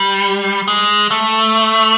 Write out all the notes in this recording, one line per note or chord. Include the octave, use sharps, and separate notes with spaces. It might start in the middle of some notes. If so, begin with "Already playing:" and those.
Already playing: G3
G#3
A3